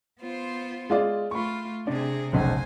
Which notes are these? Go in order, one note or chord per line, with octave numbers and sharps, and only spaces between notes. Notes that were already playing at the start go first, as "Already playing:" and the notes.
B3 F4 C5
G#3 F4 D5
A3 F4 B5 C#6
C3 D4 G#4
F1 B1 C#3 C5 G#5